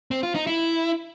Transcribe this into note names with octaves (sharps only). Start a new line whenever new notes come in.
C4
F4
D#4
E4